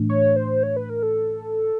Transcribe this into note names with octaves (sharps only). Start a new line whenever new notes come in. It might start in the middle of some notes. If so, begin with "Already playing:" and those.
Already playing: A2 E3 A3 D4
C#5
C5
C#5
B4
A#4
A4